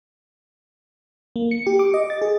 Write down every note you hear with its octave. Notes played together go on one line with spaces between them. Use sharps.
A#3
C#7
G4
D6
D#5
A6
G#4